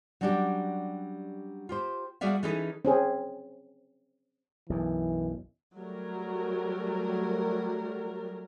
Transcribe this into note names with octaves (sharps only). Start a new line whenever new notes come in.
F#3 G3 C#4 D4 F#4 G4
F4 G4 C5
G3 F#4 G#4 D5 E5 F5
E3 C#4 D#4 G#4 A4 B4
C4 C#4 G#4
B1 F#2 E3
F#3 G3 A3 A#4